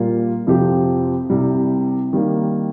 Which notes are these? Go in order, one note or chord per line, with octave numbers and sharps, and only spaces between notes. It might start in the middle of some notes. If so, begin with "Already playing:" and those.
Already playing: A#2 G3 A#3 F4
F2 C3 F3 C4 G4
C2 C3 G3
D#3 G3 A#3